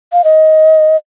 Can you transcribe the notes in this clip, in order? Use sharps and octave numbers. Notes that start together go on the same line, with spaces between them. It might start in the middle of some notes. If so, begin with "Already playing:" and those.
F5
D#5